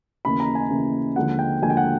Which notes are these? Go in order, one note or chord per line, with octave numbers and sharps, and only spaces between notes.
D#2 C#3 E3 B5
A#5
G#5
D#2 C#3 E3
D#2 D3 F3 G#3 F#5
G5
D#2 D3 F3 G#3 G#5
G5
F#5